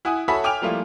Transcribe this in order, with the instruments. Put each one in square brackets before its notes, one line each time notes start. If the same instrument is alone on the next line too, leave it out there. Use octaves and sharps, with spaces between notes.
[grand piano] E4 F#5 G#5 D#6
F#4 A4 C#5 E5 G#5 B5
G5 G#5 D6 F6 D7 F7
F3 G3 A3 A#3 E4 F4